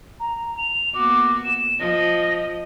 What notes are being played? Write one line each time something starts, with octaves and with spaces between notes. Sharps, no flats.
A#5
F7
A#3 B3 F#4 D6
E7
F3 D#5 A#6